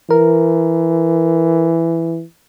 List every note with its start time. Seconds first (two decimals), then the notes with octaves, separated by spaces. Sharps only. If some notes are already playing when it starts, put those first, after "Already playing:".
0.10 E3 A#4